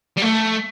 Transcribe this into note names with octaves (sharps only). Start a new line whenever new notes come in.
G3
A3